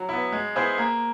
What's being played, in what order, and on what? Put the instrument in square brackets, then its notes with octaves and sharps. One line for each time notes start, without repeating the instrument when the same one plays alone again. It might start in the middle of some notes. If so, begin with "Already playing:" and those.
Already playing: [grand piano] F#3
B3 E4
G#3
B3 E4 G#4 C5
A#3